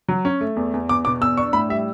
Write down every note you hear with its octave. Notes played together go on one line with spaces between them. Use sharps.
F#3
C#4
A3
E2
E2
E2 D6
B2 D6
E2 E6
D4 C#6
A2 B5
G3 E5